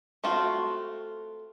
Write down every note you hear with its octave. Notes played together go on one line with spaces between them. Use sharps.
A3 C4 F4 F#4